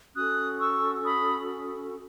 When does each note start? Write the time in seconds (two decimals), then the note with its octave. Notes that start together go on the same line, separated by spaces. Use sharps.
0.15 C#4 F#4 A4 D#6 F#6
0.60 C#6 E6
1.05 B5 D#6